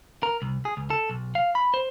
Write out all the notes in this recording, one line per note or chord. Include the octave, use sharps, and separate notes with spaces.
A#4
C2
G#4
C#2
A4
B1
F5
B5
C5